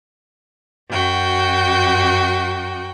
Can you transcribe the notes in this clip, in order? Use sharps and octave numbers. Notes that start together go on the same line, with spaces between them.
F#2 F#4 G5